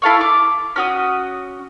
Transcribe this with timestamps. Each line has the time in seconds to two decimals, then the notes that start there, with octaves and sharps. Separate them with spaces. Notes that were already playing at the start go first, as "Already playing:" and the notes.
0.02 E4 A4 F5 C#6
0.21 D6
0.76 C#4 F#4 D#6